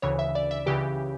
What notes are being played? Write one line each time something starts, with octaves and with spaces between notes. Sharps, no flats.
D2 C#3 E3 C#5
E5
D5
E5
C#2 C#3 E3 G4